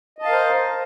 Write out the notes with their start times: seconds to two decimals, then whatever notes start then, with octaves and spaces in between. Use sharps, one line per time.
0.18 D#5
0.22 A5
0.25 F5
0.29 A#4
0.32 C5